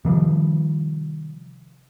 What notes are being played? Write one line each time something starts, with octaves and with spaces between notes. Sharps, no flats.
C3 D#3 F3 G3